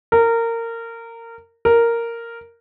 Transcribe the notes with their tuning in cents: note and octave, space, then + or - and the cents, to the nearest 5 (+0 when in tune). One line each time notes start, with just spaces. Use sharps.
A#4 -20
A#4 -5